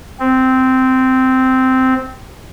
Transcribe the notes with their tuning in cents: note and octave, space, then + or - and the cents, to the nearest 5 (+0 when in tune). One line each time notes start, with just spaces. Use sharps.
C4 -10